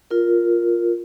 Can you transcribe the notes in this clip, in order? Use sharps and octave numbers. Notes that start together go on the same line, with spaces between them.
F4 A#4